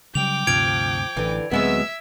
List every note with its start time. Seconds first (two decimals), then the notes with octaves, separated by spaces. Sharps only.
0.15 C#3 F#3 G3 G5 D6 F7
0.47 D2 G2 C3 F3 G#6 D7 F7
1.17 A1 D3 E3
1.52 D2 F#3 G#3 B3 C4 E5 E6